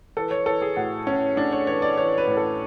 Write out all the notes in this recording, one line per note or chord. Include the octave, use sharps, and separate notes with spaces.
E3 A4
C#5
E3 A4
G#4
A2 F#4
A2 C#4
A2 D4
C#5
E3 C#5
D5
E3 C#5
B4
A2
A4